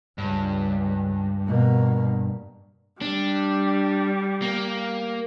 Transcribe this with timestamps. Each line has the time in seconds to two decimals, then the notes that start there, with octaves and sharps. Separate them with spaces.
0.18 C#2 G2
1.46 B2 A#3
3.02 G3 D4
4.42 A#3